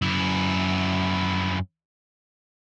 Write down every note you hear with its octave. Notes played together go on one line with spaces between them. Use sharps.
F#2 E4